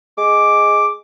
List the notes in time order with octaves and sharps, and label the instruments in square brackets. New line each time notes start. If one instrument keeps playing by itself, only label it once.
[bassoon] G#3 [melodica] D6